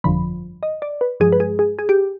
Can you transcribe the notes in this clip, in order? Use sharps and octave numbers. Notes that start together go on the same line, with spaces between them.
G1 F2 D3 F3 B5
D#5
D5
B4
G2 F3 G#3 G#4
B4
G#4
G#4
G#4
G4